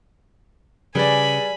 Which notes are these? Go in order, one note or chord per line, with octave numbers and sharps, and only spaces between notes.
C#3 G3 G#4 B4 D5 G#5 B5